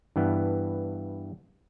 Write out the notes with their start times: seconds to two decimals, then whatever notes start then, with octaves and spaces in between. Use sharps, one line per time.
0.16 G2 E3 B3 D4